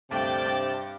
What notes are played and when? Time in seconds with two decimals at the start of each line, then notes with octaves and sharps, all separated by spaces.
0.11 D2 G2 C3 D5 G5 A5 A6
0.46 G2